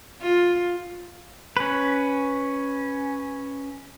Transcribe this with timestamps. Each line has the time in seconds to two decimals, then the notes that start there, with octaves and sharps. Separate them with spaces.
0.22 F4
1.57 C#4 B4